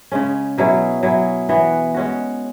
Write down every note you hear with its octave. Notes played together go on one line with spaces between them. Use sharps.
C#3 G#3 C#4
B2 F#3 E4 G#4
F#3 E4 G#4
E3 B3 F#4
G#3 C#4 F#4